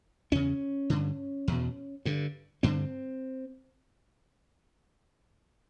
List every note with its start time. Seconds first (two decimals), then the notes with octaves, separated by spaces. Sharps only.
0.32 E2 C#3 C#4
0.90 G2 D3
1.48 E2 B2
2.05 G2 D3
2.63 G2 D3 C4